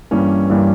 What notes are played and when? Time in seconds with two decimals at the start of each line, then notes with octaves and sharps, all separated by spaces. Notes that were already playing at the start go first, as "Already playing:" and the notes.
0.11 G2 E3 G3 A#3 C#4
0.50 G2 E3 G3 A#3 C#4